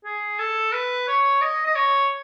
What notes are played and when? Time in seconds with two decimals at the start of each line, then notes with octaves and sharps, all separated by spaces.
0.05 G#4
0.39 A4
0.73 B4
1.07 C#5
1.41 D#5
1.66 D#5
1.75 C#5